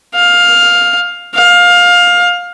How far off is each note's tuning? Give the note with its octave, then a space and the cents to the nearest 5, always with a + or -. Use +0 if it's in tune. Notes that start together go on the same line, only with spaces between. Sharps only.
F5 +15
F5 +20